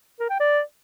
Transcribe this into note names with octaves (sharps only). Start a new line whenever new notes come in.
A#4
G5
D5